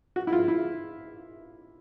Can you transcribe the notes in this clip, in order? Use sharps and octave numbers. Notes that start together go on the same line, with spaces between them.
F#4
E4
F4
E4